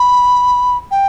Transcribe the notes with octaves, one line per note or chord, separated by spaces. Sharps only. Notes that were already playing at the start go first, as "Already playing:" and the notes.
Already playing: B5
G5